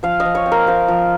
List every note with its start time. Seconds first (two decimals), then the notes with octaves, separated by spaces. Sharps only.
0.03 F3 F5
0.20 D#5
0.25 F3
0.35 C#5
0.46 C4
0.52 A#4
0.67 C4 F5
0.88 F3